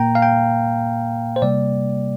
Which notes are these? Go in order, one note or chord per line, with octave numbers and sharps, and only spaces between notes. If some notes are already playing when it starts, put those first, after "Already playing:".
Already playing: A#2 A#3 G5 A#5
F5
G5
C5
C3 G3 A#3 D5